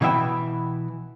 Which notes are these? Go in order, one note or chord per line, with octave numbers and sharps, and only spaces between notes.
B2 E3 B3 E5 G5